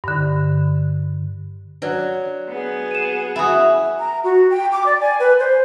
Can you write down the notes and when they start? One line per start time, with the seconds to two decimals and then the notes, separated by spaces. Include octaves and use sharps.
0.04 G2 D3
1.82 F#3 D4 B4 D5
2.49 B3 G#4
2.91 D#7 E7
3.36 E4 F#4 G#5 B5 D#6
4.00 A#5
4.24 F#4
4.50 G5
4.72 D6
4.86 D5
5.01 G#5
5.20 B4
5.40 C5